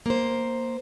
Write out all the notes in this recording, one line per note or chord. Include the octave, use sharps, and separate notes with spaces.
A#3 C5